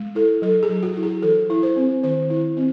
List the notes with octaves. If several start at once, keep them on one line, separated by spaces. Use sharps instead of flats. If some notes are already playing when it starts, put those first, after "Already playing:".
Already playing: G#3
E4 A4
F#3 A4
G#4
F#3
F#4
E4
G#4
E3 A4
E4
C5
C4
D#3 C5
E4
C4